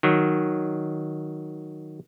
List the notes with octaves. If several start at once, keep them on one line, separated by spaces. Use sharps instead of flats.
D#3 F#3